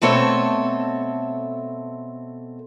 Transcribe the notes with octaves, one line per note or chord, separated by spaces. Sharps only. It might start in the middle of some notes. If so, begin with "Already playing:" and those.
B2 A3 C4 A4 C#5